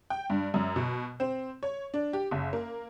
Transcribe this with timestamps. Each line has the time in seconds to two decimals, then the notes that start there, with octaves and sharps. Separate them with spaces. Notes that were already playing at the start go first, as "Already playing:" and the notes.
0.10 G5
0.30 G2
0.54 F#2
0.76 B2
1.20 C4
1.63 C#5
1.94 D4
2.13 G4
2.31 F#1
2.53 A#3